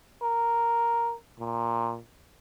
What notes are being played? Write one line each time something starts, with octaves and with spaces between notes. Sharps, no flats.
A#4
A#2